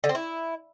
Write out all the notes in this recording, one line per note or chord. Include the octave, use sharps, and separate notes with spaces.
D3
C4
E4